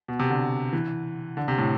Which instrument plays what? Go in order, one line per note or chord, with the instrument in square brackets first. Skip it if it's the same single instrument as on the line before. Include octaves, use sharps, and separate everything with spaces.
[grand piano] B2
C3
D3
E3
D3
C3
A2